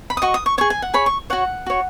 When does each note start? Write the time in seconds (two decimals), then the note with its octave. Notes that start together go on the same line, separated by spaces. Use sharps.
0.10 B5
0.17 D#6
0.22 F#4 D#5 C#6
0.34 D#6
0.46 C#6
0.58 G#4 C#5 C#6
0.70 G#5
0.82 F#5
0.94 G#4 C#5 B5
1.06 C#6
1.30 F#4 C#5 F#5
1.66 F#4 C#5